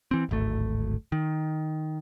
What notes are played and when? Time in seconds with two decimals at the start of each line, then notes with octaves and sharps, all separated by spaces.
0.11 E3 C4
0.29 D1 G#1 A3
1.12 D#3